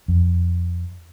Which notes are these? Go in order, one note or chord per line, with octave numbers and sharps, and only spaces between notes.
F2